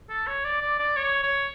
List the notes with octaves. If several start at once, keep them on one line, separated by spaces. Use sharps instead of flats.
A4
C#5
D5
D5
D5
C#5
C#5